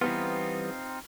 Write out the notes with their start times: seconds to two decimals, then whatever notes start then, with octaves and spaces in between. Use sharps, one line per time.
0.01 E3 G3 B3 C4 D#4 F4